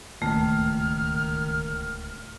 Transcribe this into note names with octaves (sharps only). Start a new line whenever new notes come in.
D1 C#2 A#2 D#3 A3 F6